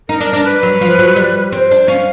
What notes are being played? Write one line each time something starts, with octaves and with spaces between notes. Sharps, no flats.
D#4 A#4
D4
D4
B4
F#3
F3
F#3
G3
C4 C5 C#5
D4
C#4 F5